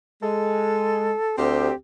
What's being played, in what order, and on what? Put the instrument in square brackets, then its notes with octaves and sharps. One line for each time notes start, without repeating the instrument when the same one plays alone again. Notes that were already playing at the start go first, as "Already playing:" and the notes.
[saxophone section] G#3 [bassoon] A4
[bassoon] D2 [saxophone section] C4 G4